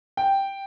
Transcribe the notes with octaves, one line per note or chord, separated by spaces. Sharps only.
G5